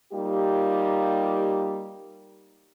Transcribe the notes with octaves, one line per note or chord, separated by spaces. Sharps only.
G3 A#3 D#4 F4 G4